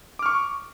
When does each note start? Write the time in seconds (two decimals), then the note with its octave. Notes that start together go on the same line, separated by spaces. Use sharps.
0.19 D6
0.23 F6
0.26 C#6